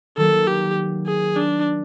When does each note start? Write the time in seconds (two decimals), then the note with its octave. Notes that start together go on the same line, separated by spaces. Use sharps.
0.17 D#3 F#3 A#3 A4
0.47 G4
1.07 G#4
1.36 D4